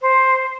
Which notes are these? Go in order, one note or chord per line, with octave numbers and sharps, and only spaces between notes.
C5